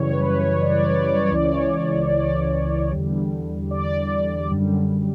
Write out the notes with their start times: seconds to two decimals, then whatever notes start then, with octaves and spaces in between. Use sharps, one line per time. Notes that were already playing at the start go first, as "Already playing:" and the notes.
Already playing: F#2 C#3 E3 G3 C#5
0.12 B4
0.33 C#5
0.52 C#5
0.61 D5
0.70 C#5
0.80 D5
0.89 C#5
0.98 D5
1.08 C#5
1.16 D5
1.26 C#5
1.31 C#2 C#3 E3 D5
1.44 C#5
2.11 D5
2.91 E2 D3 G3
3.71 D5
4.50 F#2 D3 G3